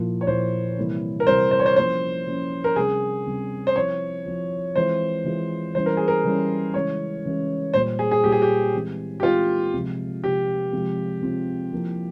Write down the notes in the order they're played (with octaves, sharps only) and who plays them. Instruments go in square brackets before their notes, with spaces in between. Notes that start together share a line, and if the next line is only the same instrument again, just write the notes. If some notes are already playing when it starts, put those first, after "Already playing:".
Already playing: [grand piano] A#2 F3 A#3 E4
[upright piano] C#5
[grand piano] A#2 F3 A#3 E4 [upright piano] C5
[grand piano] C3 E3 G3 A#3 E4
[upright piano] A#4
[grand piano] C3 E3 G3 A#3 E4 [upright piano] C5
[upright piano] C5
C#5
C5
[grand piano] F3 A#3 C#4 E4 [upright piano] C5
[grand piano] F3 A#3 C#4 E4
[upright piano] A#4
[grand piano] C3 G3 C#4 [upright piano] G#4
[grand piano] C3 G3 C#4
[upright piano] C5
[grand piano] F3 C4 E4 [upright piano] C#5
[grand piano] F3 C4 E4
[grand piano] E3 G#3 C4 F4 [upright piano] C5
[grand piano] E3 G#3 C4 F4
[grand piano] E3 G3 C#4 E4 [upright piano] C5
[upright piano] A#4
G#4
A#4
[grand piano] E3 G3 C#4 E4
[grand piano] C#3 E3 G#3 C#4 [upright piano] C#5
[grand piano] C#3 E3 G#3 C#4
[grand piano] A#2 G3 A#3 [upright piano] C5
[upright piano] G#4
G#4
[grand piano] A#2 G3 A#3 [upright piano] G4
[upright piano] G#4
G4
[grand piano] E3 G#3 C4 E4
[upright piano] G4
[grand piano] E3 G#3 C4 E4 [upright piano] F4
[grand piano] C3 F3 G#3
[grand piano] C3 F3 G#3 [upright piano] G4
[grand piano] C3 F3 G#3 C4 F4
C3 F3 G#3 C4 F4
F3 A#3 E4